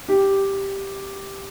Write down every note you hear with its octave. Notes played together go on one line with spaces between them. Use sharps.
G4